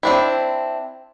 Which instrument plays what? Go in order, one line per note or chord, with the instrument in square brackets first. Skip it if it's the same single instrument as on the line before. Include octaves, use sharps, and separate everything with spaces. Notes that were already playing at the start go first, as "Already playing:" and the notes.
[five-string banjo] C4 D4 E4